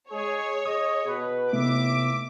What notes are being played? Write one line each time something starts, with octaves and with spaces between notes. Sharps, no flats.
G#3 G#4 C#5
G#4 D#5 D#6
B2 B4
D#2 C3 A3 B3 E4 E5 D6